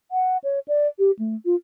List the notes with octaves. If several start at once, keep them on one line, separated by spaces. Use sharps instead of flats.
F#5
C#5
D5
G4
A3
F4